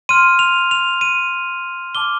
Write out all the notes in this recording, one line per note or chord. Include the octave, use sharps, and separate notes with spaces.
C6 F6 D#7
F7
F7
D#7
A5 D6 F6 G7